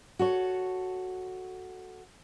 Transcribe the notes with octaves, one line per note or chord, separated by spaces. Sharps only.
F#4 A4 C#5